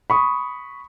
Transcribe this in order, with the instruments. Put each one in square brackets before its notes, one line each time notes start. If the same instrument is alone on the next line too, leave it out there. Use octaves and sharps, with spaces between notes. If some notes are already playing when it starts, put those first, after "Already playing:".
[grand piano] B5 C#6 D#6